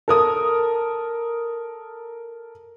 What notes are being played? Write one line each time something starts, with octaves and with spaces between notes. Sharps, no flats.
A4 A#4 D#6